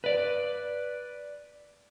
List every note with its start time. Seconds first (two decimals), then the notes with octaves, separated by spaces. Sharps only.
0.04 B4 D5